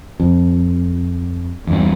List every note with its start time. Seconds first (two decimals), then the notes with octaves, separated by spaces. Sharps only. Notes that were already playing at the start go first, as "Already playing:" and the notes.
0.20 F2
1.67 E2 G2